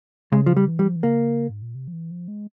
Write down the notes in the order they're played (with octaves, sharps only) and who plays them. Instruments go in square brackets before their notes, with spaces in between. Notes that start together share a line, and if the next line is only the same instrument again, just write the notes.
[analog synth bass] C#3 [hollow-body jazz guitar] G#3
[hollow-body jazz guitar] F3
G3
[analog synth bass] E3
[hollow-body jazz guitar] G3
[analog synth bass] F3
E3
[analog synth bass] C#3 [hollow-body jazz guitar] A#3
[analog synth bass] G#2
A#2
C3
F3
E3
F3
G#3